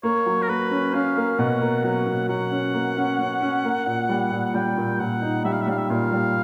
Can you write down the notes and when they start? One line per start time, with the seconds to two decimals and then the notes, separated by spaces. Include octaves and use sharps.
0.03 A#3 C#5
0.26 F#3
0.42 A#4
0.48 A#3 B4
0.71 C#4
0.93 C#4 F5
1.16 A#3
1.39 B2 F#5
1.61 A#3
1.83 F#3 F#5
2.06 B2
2.28 F#3 F#5
2.51 C#4
2.74 A#3
2.97 C#4
3.19 C#4
3.41 C#4
3.64 A#3
3.86 A#2
4.09 G3
4.32 A#2
4.45 F#5
4.54 G3 G5
4.77 A#2
4.99 A#2 F#5
5.22 D#4
5.44 G3 E5
5.52 F5
5.61 E5
5.67 G3 F5
5.77 E5
5.90 A#2 F5
6.12 G3